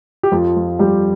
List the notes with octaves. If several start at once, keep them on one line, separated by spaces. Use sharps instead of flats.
G4
F2 F3 F4
F3
F2 G3 G4